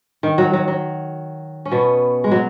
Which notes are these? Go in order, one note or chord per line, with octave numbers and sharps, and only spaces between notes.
D#3
F#3
F#3
F#3
C#4
B2 B3
G#3
F#3